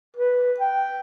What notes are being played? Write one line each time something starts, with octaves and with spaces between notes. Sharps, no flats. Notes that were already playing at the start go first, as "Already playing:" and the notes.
B4
G5